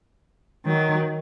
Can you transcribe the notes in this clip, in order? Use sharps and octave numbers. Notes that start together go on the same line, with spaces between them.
D#3 F#3